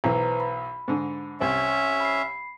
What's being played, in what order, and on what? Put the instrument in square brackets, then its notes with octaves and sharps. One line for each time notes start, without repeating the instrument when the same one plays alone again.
[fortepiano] B1 E3 [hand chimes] B4 C5 A#5
[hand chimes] B5
[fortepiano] G#2 D3
[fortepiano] C2 C4 [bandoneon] C#4 E5
[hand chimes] B5 C7